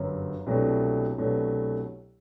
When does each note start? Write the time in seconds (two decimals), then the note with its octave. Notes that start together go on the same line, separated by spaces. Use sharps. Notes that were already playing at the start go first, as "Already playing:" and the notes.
Already playing: G1 F#2 F#3
0.46 C2 B2 F#3 A3 D4
1.18 C2 B2 F#3 A3 D4